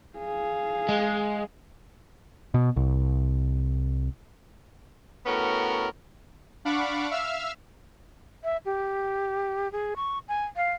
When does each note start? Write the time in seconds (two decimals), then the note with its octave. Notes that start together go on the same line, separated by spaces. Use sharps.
0.18 G#4 F5
0.89 G#3
2.54 B2
2.76 C2
5.26 A2 B3 C#4 F#4 A#4
6.65 D4 F5 F#5 B5 C#6 D6
7.11 E5 F5 E6 F6
8.44 E5
8.65 G4
9.72 G#4
9.96 C#6
10.29 G#5
10.56 F5